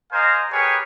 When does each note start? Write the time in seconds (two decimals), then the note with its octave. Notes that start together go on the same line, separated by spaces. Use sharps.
0.12 A#4 C5 D#5 F5 G#5 A#5
0.52 G4 G#4 A#4 B4 C#5 G#5